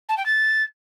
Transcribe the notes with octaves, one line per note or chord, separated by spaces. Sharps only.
A5
G5
A6